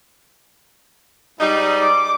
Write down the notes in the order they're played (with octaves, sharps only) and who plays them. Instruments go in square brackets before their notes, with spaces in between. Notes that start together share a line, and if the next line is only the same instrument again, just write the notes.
[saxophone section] G#2 G3 [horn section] D#4
[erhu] D6